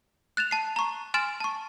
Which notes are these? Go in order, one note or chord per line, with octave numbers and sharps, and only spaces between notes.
F#6 A6 E7 F7
A5 C7
A#5 C#6
G#5 C6 F6 A6 D7 E7
A5 C#6